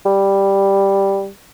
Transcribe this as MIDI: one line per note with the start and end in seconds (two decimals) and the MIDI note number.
0.06 1.28 55